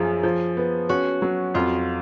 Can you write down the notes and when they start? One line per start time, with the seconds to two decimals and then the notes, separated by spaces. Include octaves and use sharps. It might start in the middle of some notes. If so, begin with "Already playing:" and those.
Already playing: F#2 F3 G#4
0.23 F3
0.57 B3
0.89 C#4 F#4
1.22 F#3
1.54 F2 F4